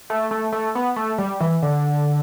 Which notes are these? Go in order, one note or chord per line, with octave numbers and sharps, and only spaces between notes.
A3
A3
A3
B3
A3
G3
E3
D3